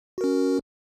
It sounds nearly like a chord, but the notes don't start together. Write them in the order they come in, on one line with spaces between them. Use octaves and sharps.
F#4 A#4 C#4